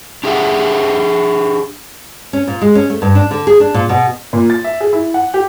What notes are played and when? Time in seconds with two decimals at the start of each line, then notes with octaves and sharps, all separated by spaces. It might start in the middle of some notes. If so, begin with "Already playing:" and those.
0.24 D4 G4 G#4 C#5 E5 F#5
2.33 C#4
2.47 A#2
2.61 G#3
2.75 C#4
2.90 A3
3.02 G2
3.15 D4
3.31 D3
3.47 G#4
3.60 D4
3.74 A#2
3.89 B2
4.33 A#2
4.50 A6
4.64 E5
4.81 G#4
4.93 E4
5.14 F#5
5.34 G4